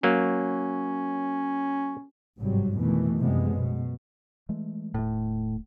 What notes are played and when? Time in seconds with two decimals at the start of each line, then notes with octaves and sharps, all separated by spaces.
0.03 F#3 A#3 C#4
2.39 G#1 G2 C3 F#3 G3
2.80 F2 B2 D#3 E3 A3
3.19 F#2 C3 F3 G3 G#3 B3
3.54 B2
4.49 E3 G#3 A3
4.94 D#1 A2 A3